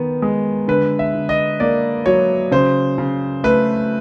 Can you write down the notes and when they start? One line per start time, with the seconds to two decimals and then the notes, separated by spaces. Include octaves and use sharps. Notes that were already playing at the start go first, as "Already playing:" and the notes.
Already playing: D#3 B3
0.22 G#3
0.68 D3 B4
0.99 E5
1.15 D3
1.29 D#5
1.60 A#3 D5
2.06 F#3 C#5
2.52 C#3 C5
2.98 C#3
3.44 A3 B4